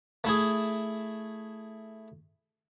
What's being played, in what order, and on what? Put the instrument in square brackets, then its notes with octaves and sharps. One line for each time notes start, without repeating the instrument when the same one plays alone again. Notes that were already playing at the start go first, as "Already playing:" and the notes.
[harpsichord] A3 E4 G#4